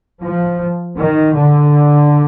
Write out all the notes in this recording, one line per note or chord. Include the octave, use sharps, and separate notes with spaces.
F3
D#3
D3